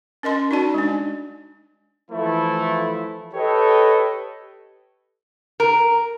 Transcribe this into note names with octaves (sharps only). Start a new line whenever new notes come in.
C#4 A#4 D#5 C6
D#4 F#4 D5 A5
G#3 D4
E3 F3 A3 E4
G4 A4 B4 C#5 D#5 G5
A#4